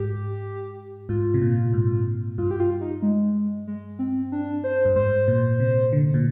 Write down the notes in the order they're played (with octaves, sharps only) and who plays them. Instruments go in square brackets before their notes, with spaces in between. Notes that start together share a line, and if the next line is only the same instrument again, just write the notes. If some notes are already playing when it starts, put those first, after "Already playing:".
Already playing: [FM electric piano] G#2 [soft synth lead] G4
[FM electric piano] G#2 [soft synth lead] F4
[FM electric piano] C3
A#2
G#2
[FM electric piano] G2 [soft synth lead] F4
[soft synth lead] G4
F4
D#4
G#3
G#3
C4
D4
C5
[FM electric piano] G2
[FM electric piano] G#2 [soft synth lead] C5
[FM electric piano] A#2
C3
D3
A#2